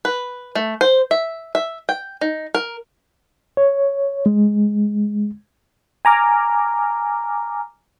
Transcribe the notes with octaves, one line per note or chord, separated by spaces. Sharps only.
B4
A3
C5
E5
E5
G5
D#4
A#4
C#5
G#3
G#5 A#5 D6 F6